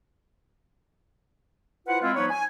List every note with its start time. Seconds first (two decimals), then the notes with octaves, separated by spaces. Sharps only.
1.87 E4 F4 B4 C5 F#5
2.02 G#3 C4 E4 F4
2.16 F3 G3 B3 D#4 B4 C#5
2.31 G#5